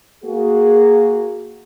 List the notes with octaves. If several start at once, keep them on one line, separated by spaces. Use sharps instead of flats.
A#3 F#4 G#4